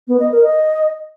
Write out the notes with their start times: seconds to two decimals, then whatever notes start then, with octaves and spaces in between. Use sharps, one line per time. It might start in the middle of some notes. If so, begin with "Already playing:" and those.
0.08 B3
0.20 D#5
0.31 A#4
0.43 D#5